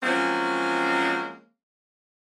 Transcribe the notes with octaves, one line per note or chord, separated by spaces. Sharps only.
F3 F#3 G#3 A#3 C4 C#4